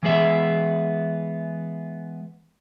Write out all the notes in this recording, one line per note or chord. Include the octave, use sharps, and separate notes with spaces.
E3 G#3 B3 G#4 E5